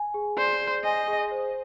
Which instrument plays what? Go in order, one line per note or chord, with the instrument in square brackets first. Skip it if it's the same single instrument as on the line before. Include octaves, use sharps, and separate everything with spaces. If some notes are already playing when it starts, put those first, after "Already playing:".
Already playing: [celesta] G#5
G#4
[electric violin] C5 [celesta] D5
[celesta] G#4
[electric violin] D#5 [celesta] G#5
[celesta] G#4
C5